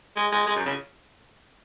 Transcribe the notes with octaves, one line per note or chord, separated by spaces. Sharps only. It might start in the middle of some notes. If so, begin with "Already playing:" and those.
G#3
G#3
G#3
F#2
C#3